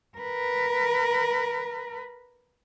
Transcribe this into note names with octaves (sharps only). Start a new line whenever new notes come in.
A#4 B4